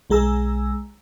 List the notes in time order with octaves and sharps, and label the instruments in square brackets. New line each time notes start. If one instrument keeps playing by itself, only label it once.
[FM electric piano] B1 G#3 G#4 A#5 E6